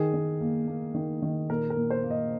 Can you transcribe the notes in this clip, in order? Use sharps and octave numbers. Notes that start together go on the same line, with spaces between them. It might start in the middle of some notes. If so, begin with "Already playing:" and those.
Already playing: D#3 G#4
D#3
A#3
A#3
D#3
D#3
A#2 A#4
A#4
A#2
C5
A#3
D#5